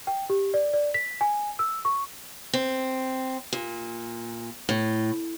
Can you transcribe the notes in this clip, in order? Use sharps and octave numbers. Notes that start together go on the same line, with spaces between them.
G5
G4
D5
D5
B6
G#5
E6
C#6
C4
A#2
A2